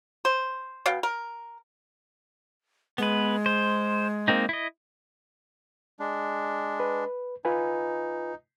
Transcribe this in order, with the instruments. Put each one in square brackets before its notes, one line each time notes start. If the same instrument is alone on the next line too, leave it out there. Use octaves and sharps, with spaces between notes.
[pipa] C5
B2 F5 G5
A#4
[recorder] G#3 [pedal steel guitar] B3 B4
[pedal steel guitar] C5
A#3 C4 D#4
E4 D#5
[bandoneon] G#3 D4
[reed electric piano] B4
[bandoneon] D#4 [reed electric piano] F4 B4 G#5